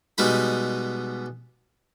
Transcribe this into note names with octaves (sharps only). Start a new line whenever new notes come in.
B2 G3 G#3 D#4 B5